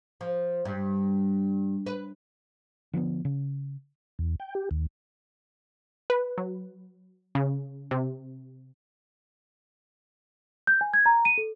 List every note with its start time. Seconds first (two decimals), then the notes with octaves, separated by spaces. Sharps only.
0.21 F3
0.65 G2
1.86 B4
2.93 D3 F3 G#3 B3
3.25 C#3
4.19 E2
4.40 G5
4.55 G4
4.71 D#2
6.10 B4
6.38 F#3
7.35 C#3
7.91 C3
10.67 G6
10.81 G#5
10.94 G#6
11.06 A#5
11.25 D#7
11.38 A4